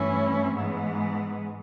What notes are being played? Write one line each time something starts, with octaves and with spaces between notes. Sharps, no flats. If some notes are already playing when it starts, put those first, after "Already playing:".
Already playing: G2 E3 A3 C#4 E4
G#2 E3 G#3 B3